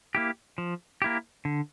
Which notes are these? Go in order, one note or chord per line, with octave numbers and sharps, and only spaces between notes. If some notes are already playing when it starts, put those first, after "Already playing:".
A#3 E4 G4
F3
A#3 E4 G4
D3